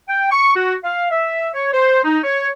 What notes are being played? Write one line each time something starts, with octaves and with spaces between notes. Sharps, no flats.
G5
C#6
F#4
F5
E5
C#5
C5
D#4
C#5